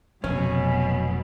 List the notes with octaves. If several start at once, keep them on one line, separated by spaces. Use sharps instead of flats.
F1 B2 F#3 C#4